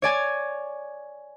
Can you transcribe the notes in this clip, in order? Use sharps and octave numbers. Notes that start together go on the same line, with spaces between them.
C#5 D5 G#5 G#6